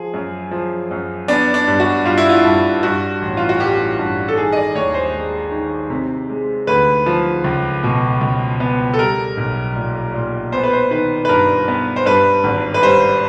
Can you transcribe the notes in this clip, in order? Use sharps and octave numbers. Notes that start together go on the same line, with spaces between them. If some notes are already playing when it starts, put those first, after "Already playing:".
Already playing: F3 G#4
F#2
F3
F#2
B3 D4
D4
G2
F#4
G2 F4
E4
F4
G2
G2 F#4
A1
F4
F#4
A1 G4
G2
A4
D#3 G#4
D#5
D5
D#2 C#5
C5
G#3
D#3
C3
G#3
D2 B4
F3
C#2
B2
C#2
B3
A4
G3 A#4
B1
A#2
A#2
B3 C5
B4
C5
D#3 B4
B4
G2 A#4
B3
C5
G2 B4
G#1
B4
G3 C5